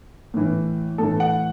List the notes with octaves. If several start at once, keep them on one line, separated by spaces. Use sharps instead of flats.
A2 E3
A2 E3 A4
F#5